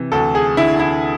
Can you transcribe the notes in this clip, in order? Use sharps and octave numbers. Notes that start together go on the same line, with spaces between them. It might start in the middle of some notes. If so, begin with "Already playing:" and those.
Already playing: C3 E3
D2 A4
G#4
D3 E4
E4